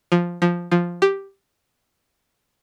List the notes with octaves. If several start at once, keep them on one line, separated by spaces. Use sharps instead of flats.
F3
F3
F3
G4